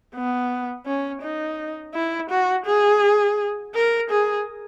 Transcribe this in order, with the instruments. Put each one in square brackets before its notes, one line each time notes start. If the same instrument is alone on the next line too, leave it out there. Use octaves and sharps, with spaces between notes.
[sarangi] B3
C#4
D#4
E4
F#4
G#4
A#4
G#4